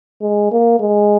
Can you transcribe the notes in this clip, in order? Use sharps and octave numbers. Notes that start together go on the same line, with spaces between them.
G#3
A#3
G#3